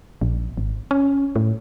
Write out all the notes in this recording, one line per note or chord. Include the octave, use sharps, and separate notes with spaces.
A#1
G#1
C#4
A2